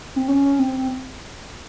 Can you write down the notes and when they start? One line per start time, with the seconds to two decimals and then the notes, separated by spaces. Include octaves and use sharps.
0.16 C4
0.28 C#4
0.59 C4